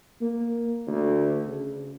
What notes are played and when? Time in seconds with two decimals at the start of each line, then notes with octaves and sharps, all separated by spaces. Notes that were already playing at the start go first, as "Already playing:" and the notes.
0.21 A#3
0.87 D2
1.47 C#3